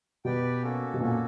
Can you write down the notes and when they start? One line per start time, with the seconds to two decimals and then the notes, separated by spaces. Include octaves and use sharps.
0.25 B2 G4 B4 D5 G5
0.62 A#3 C#4 F#4 A4
0.94 B2
1.00 A#2 A#3 C#4 F#4 A4